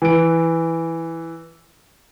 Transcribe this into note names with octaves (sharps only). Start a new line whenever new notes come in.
E3 D7